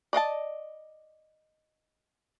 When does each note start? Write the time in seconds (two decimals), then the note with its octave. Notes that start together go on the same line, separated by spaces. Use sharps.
0.13 D5 D#5 F5 A5